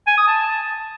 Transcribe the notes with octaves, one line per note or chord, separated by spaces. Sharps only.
G#5
D#6
A5